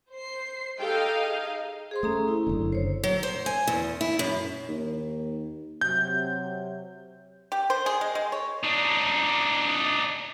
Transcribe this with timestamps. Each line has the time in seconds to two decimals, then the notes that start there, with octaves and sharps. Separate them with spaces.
0.12 C5 C7
0.79 D#4 G4 A4 D#5 F5 G5
1.26 G#4
1.91 G#4 C5 C6
2.03 A3 C#4 A#5 D#6
2.28 E4
2.47 F#1 D3
2.73 C5 C#5
3.04 F#3
3.23 C5
3.46 G#5
3.67 E2
4.01 E4
4.19 F#2
4.68 D#2
5.81 C3 F#3 G6
7.52 G4
7.70 C5
7.86 G#4
8.01 G#3
8.15 G#3
8.32 C#5
8.64 D4 D#4